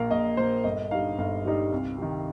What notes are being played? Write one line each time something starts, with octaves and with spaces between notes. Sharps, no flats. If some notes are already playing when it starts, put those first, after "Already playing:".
Already playing: A#1 A#2 A#3 A#4 F5
A#1 D#5
A#2 A#3 C5
G1 D#5
G2 G3 D#4 F5
G1 F5
G2 G3 D#4
C2
C3 D#3